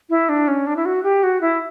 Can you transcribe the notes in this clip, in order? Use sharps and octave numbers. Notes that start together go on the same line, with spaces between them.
E4
D4
C#4
D4
E4
F#4
G4
F#4
E4